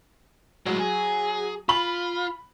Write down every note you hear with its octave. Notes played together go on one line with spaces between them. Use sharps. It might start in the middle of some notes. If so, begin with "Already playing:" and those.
A2 F#3 G#3
G#4
F4 B5 F#7